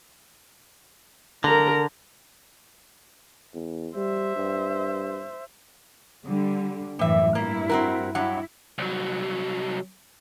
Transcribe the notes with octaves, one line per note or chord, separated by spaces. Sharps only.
D3 A#4 A#5
E2
G3 C5 E5
G2
D3 G3
F#2 A2 E3 G3 E5
G2 A#3 E4
C4 F#4 A#4
G2 F#3 E4 F#5
C2 F#3